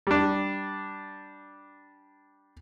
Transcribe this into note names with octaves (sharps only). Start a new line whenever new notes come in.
G3 D4